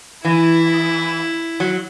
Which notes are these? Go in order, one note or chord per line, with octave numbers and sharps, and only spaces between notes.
E3 E4
F#3